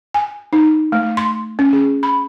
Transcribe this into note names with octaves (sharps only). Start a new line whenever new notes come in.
G#5
D#4
A3
C6
C#4
G#4
B5